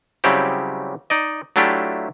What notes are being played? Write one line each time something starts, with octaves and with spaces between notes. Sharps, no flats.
C#3 F#3 G3 C4 E4 G4
D#4 D5 D#5
F#3 A3 D4 E4 F4 G4